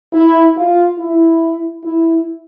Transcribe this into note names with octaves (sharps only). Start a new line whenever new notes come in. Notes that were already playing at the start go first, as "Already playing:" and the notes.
E4
F4
E4
E4